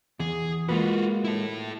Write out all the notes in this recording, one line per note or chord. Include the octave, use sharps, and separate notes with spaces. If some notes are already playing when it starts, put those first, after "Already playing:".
E2 G#4
G#3 A#3 F4 F#4 B4
E4 A4